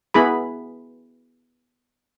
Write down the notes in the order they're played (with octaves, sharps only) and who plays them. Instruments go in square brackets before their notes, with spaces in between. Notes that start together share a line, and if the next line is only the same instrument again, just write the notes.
[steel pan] B3 E4 G#4 B5